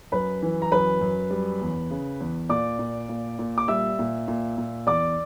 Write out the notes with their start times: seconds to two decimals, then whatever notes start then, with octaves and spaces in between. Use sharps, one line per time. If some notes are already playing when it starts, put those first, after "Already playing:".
0.12 F#2 B4 B5
0.42 E3
0.62 A#5
0.72 F#2 B4 B5
1.01 F#2
1.31 G3
1.61 E2
1.91 C#3
2.21 E2
2.49 A#2 D5 D6
2.79 A#2
3.09 A#2
3.39 A#2
3.58 D6
3.68 G3 E5 E6
3.99 A#2
4.28 A#2
4.58 A#2
4.87 E2 D5 D6